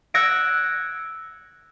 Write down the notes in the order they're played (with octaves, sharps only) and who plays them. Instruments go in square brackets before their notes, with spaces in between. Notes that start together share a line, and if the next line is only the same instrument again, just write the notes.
[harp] E6 F#6 G#6 A#6 C#7 D7